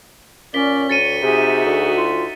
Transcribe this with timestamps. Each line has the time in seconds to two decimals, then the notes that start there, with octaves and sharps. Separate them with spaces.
0.54 A#2 C#4 D5 B6 G7
0.90 D2 C#5 A6 C#7 D#7
1.23 C3 D#4 F#4 G#4 E5
1.65 D2
1.96 F4